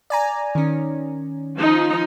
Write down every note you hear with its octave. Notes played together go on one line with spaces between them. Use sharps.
D5 G#5 A#5
D#3 C#4
F3 D#4